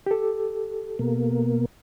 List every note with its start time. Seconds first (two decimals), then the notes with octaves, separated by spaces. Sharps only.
0.06 G4 A4
0.99 B2 A#3